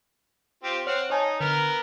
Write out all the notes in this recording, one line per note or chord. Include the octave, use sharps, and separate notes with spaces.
C4 F4 G4
C4 C#5 F#5 F6
D#4 C#5 G#5 A5
D3 B3 A#4 F6